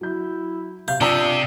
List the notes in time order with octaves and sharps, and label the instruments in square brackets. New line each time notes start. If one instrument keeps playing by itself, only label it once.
[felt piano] F#3 G6 [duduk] E4
[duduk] C3 [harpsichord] F5 [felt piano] G6
[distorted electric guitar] C3 [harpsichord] D4 [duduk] F4 [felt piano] A5 D#6 E6